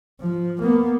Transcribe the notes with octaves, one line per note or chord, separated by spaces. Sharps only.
F3
A#3 B3